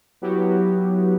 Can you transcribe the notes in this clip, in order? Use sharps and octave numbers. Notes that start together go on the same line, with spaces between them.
F#3 B3 E4 F#4 G4